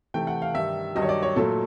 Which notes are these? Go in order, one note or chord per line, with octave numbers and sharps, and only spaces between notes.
C3 E3 A3 G5
F#5
F5
G2 D#3 G3 E5
G2 D#3 F#3 D#5
C#5
D5
C#5
A#2 F#3 A3 A4